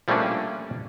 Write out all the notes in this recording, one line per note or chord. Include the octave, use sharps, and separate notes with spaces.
F3 G3 A3 A#3 C#4 D4